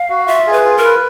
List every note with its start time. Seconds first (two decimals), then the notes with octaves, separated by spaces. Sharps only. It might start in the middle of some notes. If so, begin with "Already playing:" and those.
Already playing: F5
0.10 F#4
0.27 F4 E5
0.47 G#4
0.53 B4
0.65 F4
0.77 A#4
0.84 B4